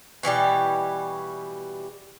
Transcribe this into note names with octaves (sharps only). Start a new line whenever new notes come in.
B2 E3 G3 G4